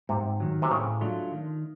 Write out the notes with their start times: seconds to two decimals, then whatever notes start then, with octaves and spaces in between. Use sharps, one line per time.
0.09 G#2 C3
0.40 D#3 F#3
0.62 C3
0.70 A2 C#3
1.01 F#3 A3 D4 F4
1.32 D#3